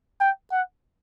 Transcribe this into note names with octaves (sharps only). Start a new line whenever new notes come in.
G5
F#5